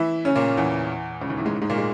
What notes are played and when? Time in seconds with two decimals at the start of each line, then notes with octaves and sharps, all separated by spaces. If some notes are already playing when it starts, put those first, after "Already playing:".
Already playing: E3 E4
0.25 C#3 C#4
0.36 A#2 A#3
0.57 E2 E3
1.21 C#2 C#3
1.29 D#2 D#3
1.37 E2 E3
1.45 G#2 G#3
1.62 G#2 G#3
1.70 A#2 A#3
1.78 G#3